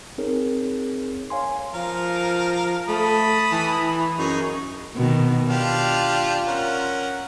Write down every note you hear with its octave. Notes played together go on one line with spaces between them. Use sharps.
C4 D#4 G#4 A#4 C#5
C#5 F5 G#5 C6
F3 A#4 F5
A3 A5 B5 D#6
E3
F#2 D#4 G#4 C#5
B2 D#3
D4 F4 G4 F5
C#4 A#4 F#5